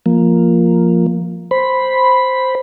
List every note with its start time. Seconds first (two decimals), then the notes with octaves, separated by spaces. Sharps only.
0.06 F3 A#3
1.51 C5 B5